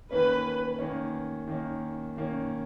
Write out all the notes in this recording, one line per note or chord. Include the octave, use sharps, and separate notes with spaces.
D#3 A#3 C#4 B4
D#3 A#3 C#4
D#3 A#3 C#4
D#3 A#3 C#4